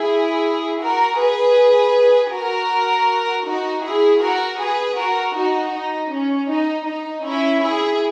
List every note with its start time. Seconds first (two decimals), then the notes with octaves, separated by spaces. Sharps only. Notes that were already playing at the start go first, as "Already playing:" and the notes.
Already playing: E4 G#4
0.81 F#4 A#4
1.18 G#4 B4
2.33 F#4 A#4
3.46 D#4 F#4
3.84 E4 G#4
4.21 F#4 A#4
4.60 G#4 B4
4.98 F#4 A#4
5.35 D#4 F#4
5.73 D#4
6.12 C#4
6.50 D#4
6.87 D#4
7.25 C#4 E4
7.63 E4 G#4